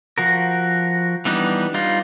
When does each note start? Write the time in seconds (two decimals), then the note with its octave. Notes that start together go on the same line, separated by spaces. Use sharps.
0.18 F3 F#4 A#4
1.25 E3 G3 B3 D4 D#4
1.74 G3 D#4 F4